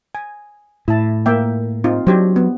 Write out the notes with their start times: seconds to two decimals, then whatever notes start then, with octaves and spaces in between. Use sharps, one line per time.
0.15 G#5
0.88 A2 E4 A5
1.26 A#3 E5 G5
1.84 C4 D#4 F4
2.07 F#3 D4 G4 C5
2.36 B3